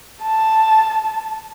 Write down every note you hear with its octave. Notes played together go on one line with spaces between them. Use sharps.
A5